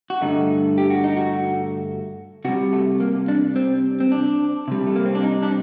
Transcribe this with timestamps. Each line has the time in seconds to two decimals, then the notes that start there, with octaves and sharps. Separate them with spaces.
0.10 F#4
0.21 G2 D3 A3 D#4
0.78 G4
0.90 F#4
1.04 D#4
1.17 F#4
2.45 C3 F#4
2.49 G3
2.73 A3
3.00 A#3
3.28 D4
3.56 C4
4.00 C4
4.12 D4
4.68 C3 G3
4.87 A3
4.96 A#3
5.05 C4
5.15 D4
5.23 D#4
5.43 D4